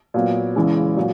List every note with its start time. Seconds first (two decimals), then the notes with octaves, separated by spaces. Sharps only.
0.14 A#2 F#3 B3
0.56 E2 C#3 E3 G#3
0.96 A#2 F#3